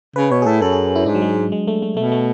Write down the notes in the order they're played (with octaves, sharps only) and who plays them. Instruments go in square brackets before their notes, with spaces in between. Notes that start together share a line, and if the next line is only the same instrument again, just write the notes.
[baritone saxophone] C#3 [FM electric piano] B4
[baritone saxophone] B2 [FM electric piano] C#5
[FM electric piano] G#4
[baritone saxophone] A2 [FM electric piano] A4
[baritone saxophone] F#2 [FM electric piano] A4
[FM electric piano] G#4
E4
[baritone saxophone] G#2 [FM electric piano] D4
[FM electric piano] F#3
G#3
G#3
A3
A3
[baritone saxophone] B2 [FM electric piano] A3
[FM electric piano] A3